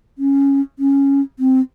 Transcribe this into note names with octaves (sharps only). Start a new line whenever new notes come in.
C#4
C#4
C4